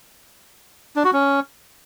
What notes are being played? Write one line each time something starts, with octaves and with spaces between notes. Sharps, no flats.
D4
F#4
C#4